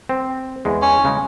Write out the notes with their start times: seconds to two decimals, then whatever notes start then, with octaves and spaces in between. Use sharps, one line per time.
0.09 C4
0.65 E2 G#3
0.82 C#4
1.05 C#3 G#3